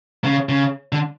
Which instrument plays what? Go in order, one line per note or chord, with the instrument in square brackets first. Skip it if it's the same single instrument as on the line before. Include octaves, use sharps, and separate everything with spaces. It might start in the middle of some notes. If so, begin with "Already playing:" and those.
[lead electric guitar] C#3
C#3
D3